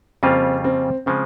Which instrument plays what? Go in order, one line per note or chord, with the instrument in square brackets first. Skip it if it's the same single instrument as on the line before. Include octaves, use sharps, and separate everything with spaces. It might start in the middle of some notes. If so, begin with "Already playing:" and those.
[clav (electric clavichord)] F2 C#3 G3 A#3 F4 [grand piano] C4
[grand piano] C4
[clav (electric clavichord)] C#3 F3 G#3 [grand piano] C4